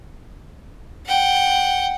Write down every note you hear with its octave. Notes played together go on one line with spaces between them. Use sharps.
F#5 G5